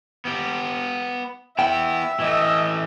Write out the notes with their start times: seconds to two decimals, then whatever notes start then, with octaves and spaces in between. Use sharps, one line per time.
0.25 B3 G4
1.59 B3 E4 E5 G5
2.20 E3 A3 D#5